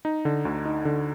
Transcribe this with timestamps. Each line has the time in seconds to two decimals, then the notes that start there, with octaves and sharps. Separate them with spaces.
0.05 D#4
0.25 D3
0.45 D2
0.66 D#4
0.85 D3